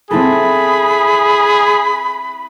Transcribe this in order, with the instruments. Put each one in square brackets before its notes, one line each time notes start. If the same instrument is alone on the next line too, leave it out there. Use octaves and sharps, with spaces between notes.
[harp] C4 E4 A4 [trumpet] G#4 [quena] B5